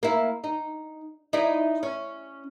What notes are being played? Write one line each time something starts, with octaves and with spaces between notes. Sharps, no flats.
A#3 E4
D#4
D#4 E4 D5
C#4